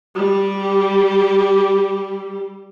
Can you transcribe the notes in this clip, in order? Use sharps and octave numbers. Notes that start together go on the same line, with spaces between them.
G3 G4